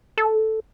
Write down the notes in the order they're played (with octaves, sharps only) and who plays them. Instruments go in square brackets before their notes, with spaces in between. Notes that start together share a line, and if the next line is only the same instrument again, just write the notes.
[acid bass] A4